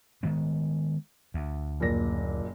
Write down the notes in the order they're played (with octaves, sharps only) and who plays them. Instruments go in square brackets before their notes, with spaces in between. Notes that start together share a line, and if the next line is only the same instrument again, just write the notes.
[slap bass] D#3 G#3 B3
D2
[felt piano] F#1 A#2 A#6